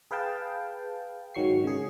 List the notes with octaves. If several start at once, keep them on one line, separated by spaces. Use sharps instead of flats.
G#4 B4 F5 G5 A5
G#2 D#3 F#3 C#6 C7
C#3 G#4